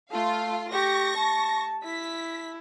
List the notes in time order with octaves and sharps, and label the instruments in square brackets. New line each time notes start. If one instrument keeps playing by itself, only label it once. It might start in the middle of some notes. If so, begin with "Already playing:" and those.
[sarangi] A3 [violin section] F4 F5
[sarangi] G4 [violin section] C#6 A#6
[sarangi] A5
[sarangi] E4 [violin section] B6